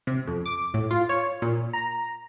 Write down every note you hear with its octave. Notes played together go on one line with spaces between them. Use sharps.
C3
F2
D6
A2
F4
C#5
A#2
A#5